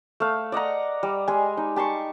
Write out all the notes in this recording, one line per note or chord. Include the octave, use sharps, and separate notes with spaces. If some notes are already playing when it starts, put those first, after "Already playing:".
A3 F5
D5 D#5 F#5 A#5
G3
G3 G#3 G#4 G#5
D#4
G4 A5 C6 C#6